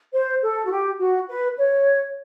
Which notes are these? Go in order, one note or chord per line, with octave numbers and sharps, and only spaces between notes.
C5
A4
F#4
G4
F#4
B4
C#5